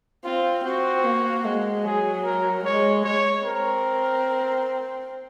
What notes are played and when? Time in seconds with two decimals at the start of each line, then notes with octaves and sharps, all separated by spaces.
0.24 C4 F4
0.64 C4 F#4
1.04 A#3
1.45 G#3
1.84 F#3 G#4
2.24 A#4
2.64 G#3 C#5
3.04 C#5
3.44 C4 A#4